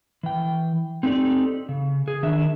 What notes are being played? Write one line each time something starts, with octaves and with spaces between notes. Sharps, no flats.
E3 G5
C4 D#4 G4 A4 D5
C#3
G#4
D#3 D4 E5